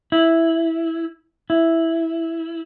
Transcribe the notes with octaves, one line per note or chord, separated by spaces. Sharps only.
E4
E4